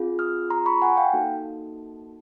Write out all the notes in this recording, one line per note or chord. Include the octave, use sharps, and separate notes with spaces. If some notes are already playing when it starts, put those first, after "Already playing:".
Already playing: C4 F4 G#4
D#6 F6
A#5 C6
B5 C#6
F#5 G#5
F5 G5
A#3 D#4 F#4 A4